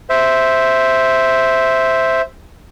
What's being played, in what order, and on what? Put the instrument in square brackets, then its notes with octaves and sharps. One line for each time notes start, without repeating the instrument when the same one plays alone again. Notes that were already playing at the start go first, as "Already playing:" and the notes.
[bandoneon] C5 E5